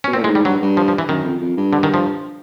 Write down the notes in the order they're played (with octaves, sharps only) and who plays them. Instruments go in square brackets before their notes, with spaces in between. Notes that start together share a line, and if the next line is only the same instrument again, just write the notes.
[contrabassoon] B2 [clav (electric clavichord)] C#4
[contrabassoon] A#2 [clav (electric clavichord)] C4
[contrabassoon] A2
[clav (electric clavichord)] G#3
[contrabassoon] G#2
[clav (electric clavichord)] G3
[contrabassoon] G2 [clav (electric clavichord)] F#3
[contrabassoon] G2
[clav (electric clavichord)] F3
F3
E3
[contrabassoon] F#2 [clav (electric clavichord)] D#3
[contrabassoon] F2
F2
G2
[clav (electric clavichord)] D3
D#3
F3